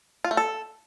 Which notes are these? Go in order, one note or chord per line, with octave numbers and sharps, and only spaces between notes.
F4
A3
A4